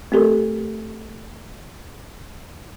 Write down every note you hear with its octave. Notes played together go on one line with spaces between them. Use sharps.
A3 C4 G4 A4 A#4